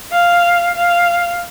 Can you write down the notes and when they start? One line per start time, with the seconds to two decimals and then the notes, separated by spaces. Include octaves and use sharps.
0.12 F5
0.75 F5